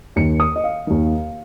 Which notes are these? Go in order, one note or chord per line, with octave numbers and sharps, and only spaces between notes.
D#2 D#3 C#7
D#6
D#5
F5
D#2 D#3